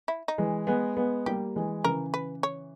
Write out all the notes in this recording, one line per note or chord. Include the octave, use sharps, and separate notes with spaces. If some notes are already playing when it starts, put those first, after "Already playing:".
E4
D#4
E3 G#3
G#3 B3
G#3 B3
G3 A#3 G4
E3 G#3
C#3 E3 A#4
B4
C#5